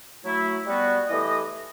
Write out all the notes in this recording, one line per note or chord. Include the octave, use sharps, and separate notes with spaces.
F#3 A3 E4
G3 B3 F#4
E3 A3 E4 G4 D#5